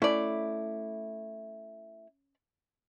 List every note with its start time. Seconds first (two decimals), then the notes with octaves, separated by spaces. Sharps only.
0.02 A3 C#4 E4 D5